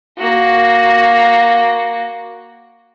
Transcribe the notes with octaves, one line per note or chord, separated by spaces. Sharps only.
A#3 F#4